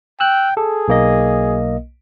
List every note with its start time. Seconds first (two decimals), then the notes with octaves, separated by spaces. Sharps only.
0.20 G5 E6 F#6
0.57 G#4 A4
0.88 B1 A#3 D#5